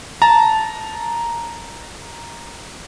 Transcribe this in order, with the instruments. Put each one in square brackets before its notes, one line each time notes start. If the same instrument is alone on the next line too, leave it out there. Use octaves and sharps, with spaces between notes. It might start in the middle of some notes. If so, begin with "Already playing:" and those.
[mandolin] A5 [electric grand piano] A#5